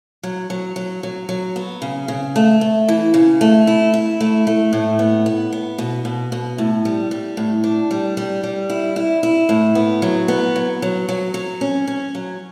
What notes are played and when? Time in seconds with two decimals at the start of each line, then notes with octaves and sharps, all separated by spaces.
0.23 F#3
0.50 F#3
0.76 F#3
1.03 F#3
1.29 F#3
1.56 B3
1.82 C#3
2.08 C#3
2.36 A3
2.61 A3
2.89 E3
3.14 C#3
3.41 A3
3.67 E4
3.94 E4
4.20 A3
4.47 A3
4.73 A2
4.99 B3
5.26 B3
5.53 B3
5.78 B2
6.05 B2
6.32 B2
6.58 A2
6.85 G3
7.11 G3
7.37 A2
7.64 D4
7.91 G3
8.17 G3
8.43 G3
8.70 E4
8.96 E4
9.23 E4
9.49 A2
9.75 B3
10.02 F#3
10.28 B3
10.56 F#3
10.82 F#3
11.09 F#3
11.34 F#3
11.61 C#4
11.87 C#4
12.15 F#3